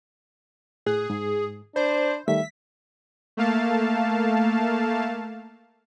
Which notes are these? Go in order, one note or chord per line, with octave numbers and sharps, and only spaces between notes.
A2 G#4 F#6
G#2
D4 C5 B5
D#3 G3 A3 E5 B6
A3 A#3 F5 A5